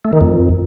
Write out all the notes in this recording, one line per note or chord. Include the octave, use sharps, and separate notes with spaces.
A3
D#3
F2